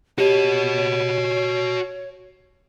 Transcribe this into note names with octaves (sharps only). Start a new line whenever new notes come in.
F#4 G4 C#5 D#5